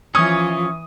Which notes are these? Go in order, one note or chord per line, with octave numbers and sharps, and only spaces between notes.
E3 F3 C#4 C#5 D#6